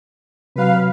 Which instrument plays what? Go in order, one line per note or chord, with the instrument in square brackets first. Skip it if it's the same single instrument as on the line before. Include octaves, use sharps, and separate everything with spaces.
[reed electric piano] C3 F#3 [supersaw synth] B4 F5